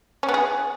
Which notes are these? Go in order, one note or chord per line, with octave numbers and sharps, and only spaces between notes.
C#4
B3
G#4